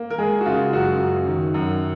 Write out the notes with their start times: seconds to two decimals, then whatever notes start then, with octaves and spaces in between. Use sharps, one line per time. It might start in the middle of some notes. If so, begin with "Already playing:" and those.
Already playing: A#3
0.10 A#4
0.18 G#3 G#4
0.40 F#4
0.45 C#3 F4
0.73 F#2 F#4
1.00 F#2
1.28 D#3
1.54 F#2